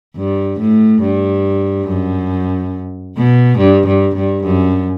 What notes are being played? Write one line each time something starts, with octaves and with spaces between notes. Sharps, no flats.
G2
A2
G2
F#2
B2
G2
G2
G2
F#2